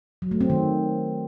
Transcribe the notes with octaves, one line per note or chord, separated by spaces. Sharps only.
F#3
A3
C4
D#3